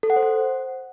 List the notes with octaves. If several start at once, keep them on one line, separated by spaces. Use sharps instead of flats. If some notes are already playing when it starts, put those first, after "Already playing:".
A4
F#5
C5
F#5